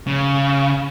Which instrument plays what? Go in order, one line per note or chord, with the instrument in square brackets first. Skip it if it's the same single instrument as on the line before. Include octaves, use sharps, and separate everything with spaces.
[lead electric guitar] C#3